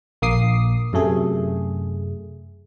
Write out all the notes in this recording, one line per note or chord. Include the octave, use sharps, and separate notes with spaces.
A#1 A#3 D6 D#6 C7
F#2 C3 A3 G#4